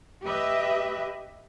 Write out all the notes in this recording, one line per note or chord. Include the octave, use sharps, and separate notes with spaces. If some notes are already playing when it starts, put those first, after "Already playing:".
G4 B4 D#5 E5